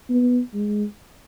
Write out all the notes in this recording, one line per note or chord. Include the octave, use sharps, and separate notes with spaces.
B3
G#3